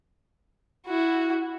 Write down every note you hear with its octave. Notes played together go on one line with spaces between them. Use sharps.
E4 F#4